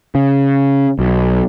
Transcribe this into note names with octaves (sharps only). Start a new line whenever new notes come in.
C#3
B1